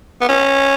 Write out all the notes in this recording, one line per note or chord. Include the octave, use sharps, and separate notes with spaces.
B3
C#4